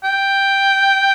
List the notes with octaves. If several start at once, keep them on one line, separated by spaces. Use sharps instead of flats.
G5